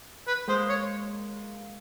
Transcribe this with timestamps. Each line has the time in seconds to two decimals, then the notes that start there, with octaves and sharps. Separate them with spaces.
0.27 B4
0.48 G#3 A#3 C5
0.69 C#5